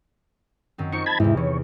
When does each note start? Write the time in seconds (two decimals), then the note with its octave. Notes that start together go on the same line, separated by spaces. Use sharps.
0.78 F#2 D#3 C4
0.93 D#4 F4 C5 C#6
1.06 A5 B5 G#6
1.20 E2 G#2 C3 E4
1.37 E3 C#5